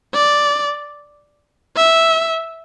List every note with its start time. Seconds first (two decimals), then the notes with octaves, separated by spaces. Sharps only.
0.14 D5
1.77 E5